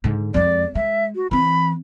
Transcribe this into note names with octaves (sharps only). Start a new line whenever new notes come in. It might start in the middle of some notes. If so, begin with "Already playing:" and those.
G#2 D3
F2 G#3 D5
G#3 E5
F#4
E3 C4 B5